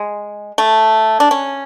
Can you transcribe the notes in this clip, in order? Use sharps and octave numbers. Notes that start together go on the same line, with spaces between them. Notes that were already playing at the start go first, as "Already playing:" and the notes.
Already playing: G#3
A3
D4
C#4